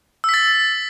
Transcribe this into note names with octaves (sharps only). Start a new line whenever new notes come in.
E6 A6 B6